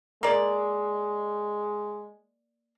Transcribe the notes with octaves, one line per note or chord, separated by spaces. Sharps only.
G#3 A#3 D5